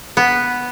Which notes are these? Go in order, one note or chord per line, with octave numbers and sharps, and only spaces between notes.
B3